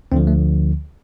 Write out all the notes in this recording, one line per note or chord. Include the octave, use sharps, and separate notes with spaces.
D2 D3 F3 C4
A3